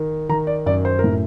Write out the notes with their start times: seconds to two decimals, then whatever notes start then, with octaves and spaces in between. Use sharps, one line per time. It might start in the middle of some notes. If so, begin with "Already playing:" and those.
Already playing: D#3
0.29 D#3 A#5
0.47 D5
0.66 F#2 D5
0.85 C5
0.99 A#4
1.04 A2